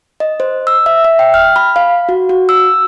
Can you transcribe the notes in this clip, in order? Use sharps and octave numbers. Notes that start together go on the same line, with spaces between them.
D#5
C5
E6
E5
E5
G5
F6
B5
F5
F#4
F#4
E6